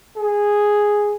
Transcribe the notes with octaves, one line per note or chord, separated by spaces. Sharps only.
G#4